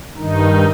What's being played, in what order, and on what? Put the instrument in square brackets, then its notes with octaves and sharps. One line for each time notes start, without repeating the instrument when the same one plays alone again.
[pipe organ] G2 D#3 D#4